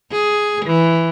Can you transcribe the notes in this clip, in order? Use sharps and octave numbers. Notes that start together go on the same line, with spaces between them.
G#4
E3